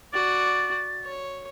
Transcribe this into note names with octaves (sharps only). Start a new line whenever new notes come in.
F#4 D5 A6
C#5